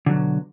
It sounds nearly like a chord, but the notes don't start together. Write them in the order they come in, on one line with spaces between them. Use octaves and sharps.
D3 F#3 B2